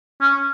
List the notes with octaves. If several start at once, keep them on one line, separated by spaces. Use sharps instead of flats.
C#4